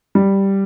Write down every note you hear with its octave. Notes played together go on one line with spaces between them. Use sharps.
G3